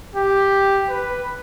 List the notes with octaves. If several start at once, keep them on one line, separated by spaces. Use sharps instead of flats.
G4
B4